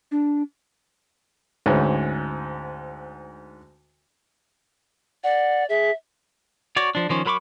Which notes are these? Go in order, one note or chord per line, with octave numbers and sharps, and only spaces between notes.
D4
D2 G#2 C#4 B4
D5 F#5
G#4 E5
F#4 C#5 D5
F3 D4
D#3 F3 C#4
F#3 A#4 B5 C#6 D6